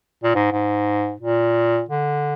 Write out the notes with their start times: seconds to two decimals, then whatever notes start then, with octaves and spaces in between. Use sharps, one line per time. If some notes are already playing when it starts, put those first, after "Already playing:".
0.24 A#2
0.35 G#2
0.52 G#2
1.20 A#2
1.89 D3